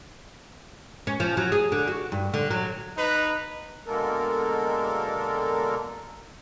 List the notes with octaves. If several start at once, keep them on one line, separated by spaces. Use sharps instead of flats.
C#4
F3
F#3
G#4
D3
F#4
G2
D3
F#3
D#4 B4
B2 D3 G#3 A#3 A4 A#4